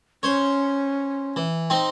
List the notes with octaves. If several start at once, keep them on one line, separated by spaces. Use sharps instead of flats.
C#4 C5 C#5
E3
C4 D#4